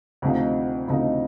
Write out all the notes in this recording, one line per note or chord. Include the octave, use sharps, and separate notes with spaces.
D2 C3 F3 A3 D#4
D2 C3 F3 A3 D#4